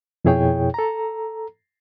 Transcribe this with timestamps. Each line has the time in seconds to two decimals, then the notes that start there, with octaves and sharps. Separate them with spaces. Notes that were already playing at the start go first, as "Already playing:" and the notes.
0.25 F2 B2 E4 G#4 C#5 G5
0.74 A4 A#5